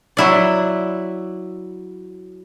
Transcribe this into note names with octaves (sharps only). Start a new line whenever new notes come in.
F#3 E4 D5